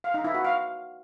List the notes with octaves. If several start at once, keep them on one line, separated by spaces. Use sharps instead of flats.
F5
D#4
E4
F#4
F5